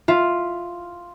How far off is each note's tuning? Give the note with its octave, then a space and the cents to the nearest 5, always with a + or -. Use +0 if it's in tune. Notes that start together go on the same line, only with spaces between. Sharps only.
F4 +0 E5 +0